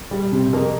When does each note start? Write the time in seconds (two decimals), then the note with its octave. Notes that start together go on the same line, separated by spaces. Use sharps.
0.11 G3
0.32 C3
0.53 F2 A#4